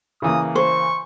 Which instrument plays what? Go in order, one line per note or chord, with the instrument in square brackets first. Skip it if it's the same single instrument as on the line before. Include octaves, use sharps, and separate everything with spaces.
[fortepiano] C#3 E3 A#3 [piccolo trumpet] D#6
[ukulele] C5 [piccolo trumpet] C#6